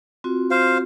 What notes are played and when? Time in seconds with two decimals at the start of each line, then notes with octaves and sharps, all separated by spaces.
0.24 C4 F4 F#4
0.51 C5 F5